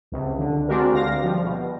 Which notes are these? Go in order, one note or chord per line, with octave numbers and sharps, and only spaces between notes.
C#2 C3
D3
G#3 C4 D4 F#4 G4 A#4
D2 F5 A#6
F3 G3
B2